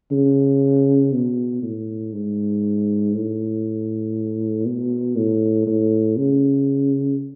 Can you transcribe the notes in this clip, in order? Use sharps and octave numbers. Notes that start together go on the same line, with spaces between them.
C#3
B2
A2
G#2
A2
B2
A2
A2
C#3